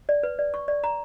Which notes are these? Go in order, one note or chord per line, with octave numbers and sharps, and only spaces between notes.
D5
B4
D5
C#6
D5
A#5